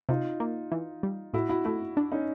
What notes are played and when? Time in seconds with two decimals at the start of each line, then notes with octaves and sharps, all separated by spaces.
0.09 C3 D#4 F4
0.40 A#3
0.72 E3
1.03 G3
1.33 A2 E4 F#4
1.49 E4 F#4
1.65 A3 E4 F#4
1.97 D4
2.12 C#4 D#4